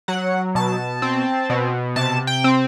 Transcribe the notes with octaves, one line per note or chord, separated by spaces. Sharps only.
F#3 F#5
B2 A5
C4
B2
C3 A5
G5
C4